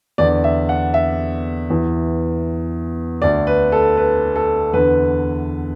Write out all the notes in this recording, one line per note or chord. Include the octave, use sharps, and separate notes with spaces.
E2 D3 D5
E5
F#5
E5
E2 E3
D2 D3 D5
B4
A4
B4
A4
E2 D3 B4